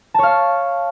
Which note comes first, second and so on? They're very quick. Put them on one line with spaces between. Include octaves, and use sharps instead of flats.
A5 C#5 F5